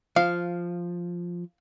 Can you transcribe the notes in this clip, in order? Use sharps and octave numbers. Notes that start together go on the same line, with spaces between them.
F3 F5